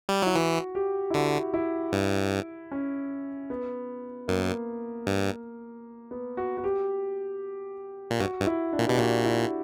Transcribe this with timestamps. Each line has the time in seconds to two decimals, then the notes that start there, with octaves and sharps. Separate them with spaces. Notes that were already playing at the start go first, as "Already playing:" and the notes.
0.09 G3
0.22 F#3 E4
0.35 E3 F#4
0.75 G4
1.10 E4
1.14 D3 F#4
1.54 E4
1.92 G2
2.72 C#4
3.50 B3
4.28 F#2 A#3
5.07 G2
6.11 B3
6.37 F#4
6.57 F#4
6.64 G4
8.11 A#2
8.19 G2 F#4
8.40 G2
8.46 E4
8.73 D4
8.79 A#2
8.87 B2 G4
8.98 A#2 F#4
9.25 E4